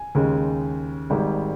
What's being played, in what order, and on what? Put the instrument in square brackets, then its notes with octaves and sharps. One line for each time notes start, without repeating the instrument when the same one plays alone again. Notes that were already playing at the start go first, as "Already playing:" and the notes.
Already playing: [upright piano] G#5
D#2 C#3 G#3
G#1 G#2 G3